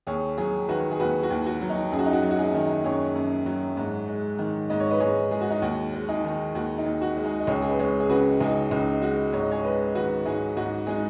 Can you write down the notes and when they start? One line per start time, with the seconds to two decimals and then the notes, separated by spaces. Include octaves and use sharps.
0.07 D#2 G#4 C#5
0.38 F#3 G#4 C#5
0.68 D#3 F#4 B4
0.91 G#4
1.00 D#2 F#4 B4
1.23 F#4
1.30 D#2
1.46 F#4
1.61 F#3
1.70 D#4
1.92 F#2 G#4
1.99 F#4
2.06 D#4
2.13 F#4
2.23 F#3
2.31 F#4
2.39 D#4 G#4
2.54 D#3
2.84 F#2 G#4 C#5
3.15 F#2
3.46 F#3
3.77 G#2
4.08 G#3
4.39 D#3
4.70 G#2 D#5
4.80 C#5
4.90 B4 D#5
5.00 G#2 G#4 C#5
5.31 G#3 G#4
5.41 F#4
5.50 D#4 G#4
5.62 D#2 F#4
5.94 G#3
6.09 D#4 G#4
6.25 D#3
6.55 D#2 F#4
6.78 D#4
6.86 D#2
7.02 F#4
7.17 G#3
7.24 D#4 G#4
7.40 D#5
7.47 C#2 G#4 C#5
7.62 G#4
7.70 B4
7.79 G#3 G#4 C#5
8.00 G#4
8.09 C#3 F#4 B4
8.40 C#2 D#4 G#4
8.71 C#2 D#4
9.02 G#3 F#4
9.33 G#2 C#5
9.43 D#5
9.51 G#4 C#5
9.64 G#3 B4 D#5
9.95 D#3 F#4 B4
10.25 G#2 D#4 G#4
10.57 G#2 F#4
10.87 G#3 D#4 G#4